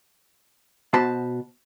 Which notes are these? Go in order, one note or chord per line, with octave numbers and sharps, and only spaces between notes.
B2 F#4 C5 A5 B5